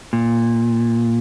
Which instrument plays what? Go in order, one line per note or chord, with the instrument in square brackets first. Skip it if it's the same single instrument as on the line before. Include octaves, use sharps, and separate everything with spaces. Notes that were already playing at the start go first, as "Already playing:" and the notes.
[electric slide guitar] A#2